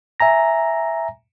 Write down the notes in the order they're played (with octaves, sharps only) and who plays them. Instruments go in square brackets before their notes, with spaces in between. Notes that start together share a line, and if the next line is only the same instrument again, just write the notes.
[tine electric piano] E5 G#5 A#5 A#6